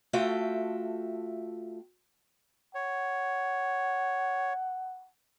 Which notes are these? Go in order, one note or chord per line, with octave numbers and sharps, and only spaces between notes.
A3 F4 F#4 A4 E5 G5
C#5 F#5